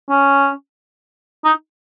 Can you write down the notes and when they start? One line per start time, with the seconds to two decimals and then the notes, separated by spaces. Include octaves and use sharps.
0.09 C#4
1.45 D#4